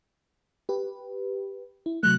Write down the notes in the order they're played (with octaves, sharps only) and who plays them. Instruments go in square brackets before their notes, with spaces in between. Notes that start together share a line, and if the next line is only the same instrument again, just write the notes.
[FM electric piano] G4 B4
E4
[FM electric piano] C3 F#3 A3 [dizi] F#6